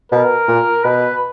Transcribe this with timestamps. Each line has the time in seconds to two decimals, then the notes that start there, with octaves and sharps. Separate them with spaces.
0.12 B2 A#4
0.48 A#2
0.84 B2 B4